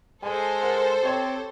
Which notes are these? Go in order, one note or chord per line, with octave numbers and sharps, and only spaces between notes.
G#3 A4 C5 G#5
A#4 F#5
C4 G4 C#5